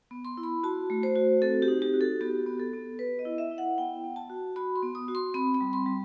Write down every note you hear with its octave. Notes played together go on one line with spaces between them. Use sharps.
B3
C6
E4
B5
F#4 A5
A3
C5
F#4
C4 A4
G4
D#4
G4
F#4
A4
B3 G4
B3
A4
B3
B3 B4
D#5
E4
E5
E4
F#5
B3 G5
B3
A5
F#4
F#4 B5
C6
B3
D#6
F#4
C6
C4 B5
B5
G3
C6
G3